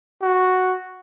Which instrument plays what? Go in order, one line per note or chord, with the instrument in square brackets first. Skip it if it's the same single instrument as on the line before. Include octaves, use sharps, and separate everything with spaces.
[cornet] F#4